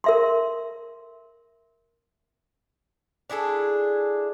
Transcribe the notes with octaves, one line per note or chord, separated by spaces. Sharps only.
A#4 E5 C6
D4 E4 G#4 A4